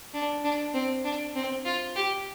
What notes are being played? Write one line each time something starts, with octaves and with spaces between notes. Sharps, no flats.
D4
D4
C4
D4
C4
F4
G4